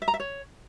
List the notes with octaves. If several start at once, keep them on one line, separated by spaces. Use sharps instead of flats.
E5
A#5
E5
C#5